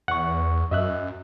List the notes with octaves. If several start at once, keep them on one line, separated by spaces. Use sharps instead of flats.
E2 F#5 C#6
F#2 D#5 E5 F#6